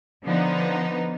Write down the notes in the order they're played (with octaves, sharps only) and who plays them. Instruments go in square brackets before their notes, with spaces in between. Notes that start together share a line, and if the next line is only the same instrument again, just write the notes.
[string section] D3 F3 B3 D#4